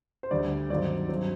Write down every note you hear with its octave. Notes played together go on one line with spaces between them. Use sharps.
C5
D2 D3 G3 D5
G2 D#3 F#3 C4 D#4 D5
G2 F#3 C4 D#4